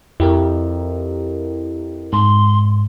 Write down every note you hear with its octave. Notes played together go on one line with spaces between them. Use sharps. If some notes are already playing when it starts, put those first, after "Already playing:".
F2 E4 G4 A#4
G#2 C6